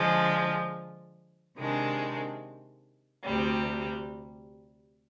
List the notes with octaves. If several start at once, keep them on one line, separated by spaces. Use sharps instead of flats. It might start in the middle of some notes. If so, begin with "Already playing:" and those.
Already playing: D3 F3 G#3
C3 D#3 G#3 D4
D2 C3 G3